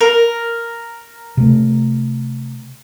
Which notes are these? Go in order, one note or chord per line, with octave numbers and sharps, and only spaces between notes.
A#4
C3 A3